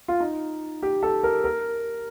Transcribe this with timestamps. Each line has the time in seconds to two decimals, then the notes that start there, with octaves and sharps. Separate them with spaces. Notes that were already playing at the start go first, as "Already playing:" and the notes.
0.08 F4
0.20 D#4
0.83 G4
1.03 A4
1.23 A#4
1.44 A#4